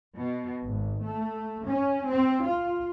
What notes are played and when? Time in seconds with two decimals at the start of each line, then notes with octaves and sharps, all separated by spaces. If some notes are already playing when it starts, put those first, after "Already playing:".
0.18 B2
0.66 G#1
1.04 A3
1.68 C#4
2.09 C4
2.45 F4